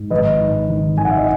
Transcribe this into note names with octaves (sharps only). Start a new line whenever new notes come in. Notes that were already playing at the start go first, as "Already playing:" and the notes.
Already playing: G#2
G#1 B4 D#5
G#2
D#3
G#1 G#5
F#5
E5
D#5